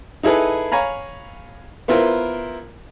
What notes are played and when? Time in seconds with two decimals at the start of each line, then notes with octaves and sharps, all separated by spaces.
0.23 D#4 E4 G#4 A4 B4
0.72 C#5 F5 G#5 A#5 B5
1.88 B3 E4 F4 A#4 C5